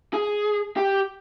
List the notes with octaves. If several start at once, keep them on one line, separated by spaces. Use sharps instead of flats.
G#4
G4